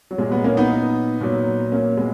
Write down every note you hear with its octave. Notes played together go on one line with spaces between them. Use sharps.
F#3
A#2 F#3 G#3
G#3 B3
A#3 C#4
B3 D#4
A#2 F#3
A#3 C#4
G#3 B3